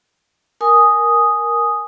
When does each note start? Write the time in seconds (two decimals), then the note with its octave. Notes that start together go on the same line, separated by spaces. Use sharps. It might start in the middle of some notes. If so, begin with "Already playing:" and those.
0.61 A#4 G#5 D#6